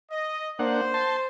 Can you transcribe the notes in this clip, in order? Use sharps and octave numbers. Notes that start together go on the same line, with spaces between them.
D#5
A#3 D4 C5 F#5
A5 C6